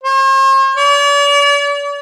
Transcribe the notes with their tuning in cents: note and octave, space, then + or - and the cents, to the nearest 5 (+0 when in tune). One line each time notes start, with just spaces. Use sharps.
C5 +45
D5 -45